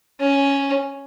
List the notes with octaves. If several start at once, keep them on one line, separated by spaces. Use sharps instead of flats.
C#4